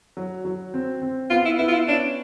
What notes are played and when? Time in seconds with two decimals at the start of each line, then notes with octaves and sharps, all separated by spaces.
0.17 F#3
0.45 F#3
0.74 C4
1.02 C4
1.30 B3 F4
1.45 E4
1.59 B3 E4
1.68 F4
1.73 E4
1.87 C#4 D4